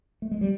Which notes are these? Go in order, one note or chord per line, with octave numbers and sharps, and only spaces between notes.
A3
G#3
G3